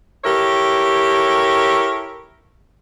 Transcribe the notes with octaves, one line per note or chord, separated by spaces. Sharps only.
E4 G4 A4 A#4 C#5